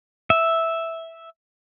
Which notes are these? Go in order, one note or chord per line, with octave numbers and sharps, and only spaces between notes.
E5